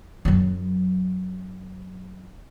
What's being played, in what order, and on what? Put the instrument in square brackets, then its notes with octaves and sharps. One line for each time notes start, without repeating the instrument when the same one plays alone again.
[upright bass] F#2 F#3